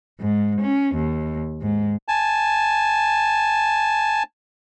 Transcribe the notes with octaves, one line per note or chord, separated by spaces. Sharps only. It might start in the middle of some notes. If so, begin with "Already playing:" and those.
G#2
C#4
D#2
G#2
G#5 A5